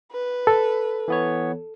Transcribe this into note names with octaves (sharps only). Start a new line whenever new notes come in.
B4
A4
E3 B3 C#5